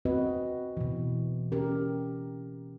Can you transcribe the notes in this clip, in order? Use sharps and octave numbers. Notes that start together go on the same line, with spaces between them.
C4 F#4 B4 D#5
B2 E3
C#4 G4 A#4